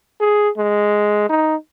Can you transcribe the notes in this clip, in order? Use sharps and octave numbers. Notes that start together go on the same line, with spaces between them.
G#4
G#3
D#4